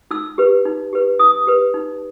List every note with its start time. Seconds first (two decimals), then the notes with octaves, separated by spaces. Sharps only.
0.11 D#4 E6
0.38 G4 B4
0.65 D#4
0.93 G4 B4
1.19 D#4 D#6
1.47 G4 B4
1.74 D#4